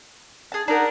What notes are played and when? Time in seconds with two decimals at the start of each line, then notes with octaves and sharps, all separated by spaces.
0.52 G#4 A5
0.68 D4 D#4 A#4 F#5